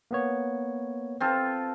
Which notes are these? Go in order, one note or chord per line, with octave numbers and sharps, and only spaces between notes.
A#3 B3 C#5
C4 F4 A4